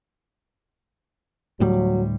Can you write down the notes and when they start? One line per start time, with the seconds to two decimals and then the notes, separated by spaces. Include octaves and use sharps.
1.60 D2 A2 F#3 G3